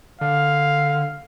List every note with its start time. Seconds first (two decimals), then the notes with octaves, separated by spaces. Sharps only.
0.21 D3 F5